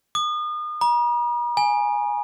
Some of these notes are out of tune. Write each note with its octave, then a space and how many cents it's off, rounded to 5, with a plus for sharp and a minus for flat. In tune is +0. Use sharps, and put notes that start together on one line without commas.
D#6 -35
A#5 +45
G#5 +0